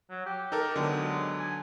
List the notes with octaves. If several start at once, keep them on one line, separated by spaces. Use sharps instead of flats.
F#3
G4
D#4 A4 A#4
D3 F#3 G#3 B3
G#5